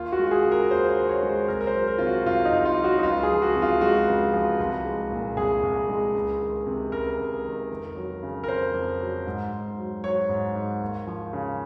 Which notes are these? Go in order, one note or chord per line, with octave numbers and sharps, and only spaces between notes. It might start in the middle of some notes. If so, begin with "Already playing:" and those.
Already playing: D#2 F4
F#4
G#3
F#4
G#4
C#3
A#4
D#2 C5
C5
D#2
C#5
G#3
C5
C2 A#4
A#4
C5
F#3
A#4
C3 F4
F#4
C2 F4
D#4
C2
F4
F#3
F#4
D#4
C#2 F4
G#4
F3
F#4
C3
F4
G#3 F#4
C#2
F3
C2
G#3
A#2
C2 G#4
C2
G#3
C#2
D#3
C3
C#2 A#4
C#2
D#3
F2
F#3
C#3
A#4
F2 C5
F2
F#3
G#2
G#2
F#3
F#3 C#5
G#2
G#2
D#2
F3
C#3